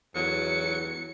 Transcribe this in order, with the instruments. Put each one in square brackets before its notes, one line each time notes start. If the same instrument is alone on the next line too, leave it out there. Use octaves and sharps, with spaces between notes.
[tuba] E2 [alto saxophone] F#3 [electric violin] C#7